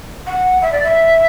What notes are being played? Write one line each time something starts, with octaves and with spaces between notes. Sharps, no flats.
F#5
E5
D5
E5